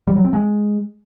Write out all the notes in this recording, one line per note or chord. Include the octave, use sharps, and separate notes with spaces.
G3
F#3
C4
G#3